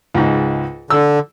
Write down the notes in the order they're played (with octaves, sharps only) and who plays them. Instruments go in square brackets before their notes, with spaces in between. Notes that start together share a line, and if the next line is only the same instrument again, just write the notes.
[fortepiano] C#2 G#2
[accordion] D3 [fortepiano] E6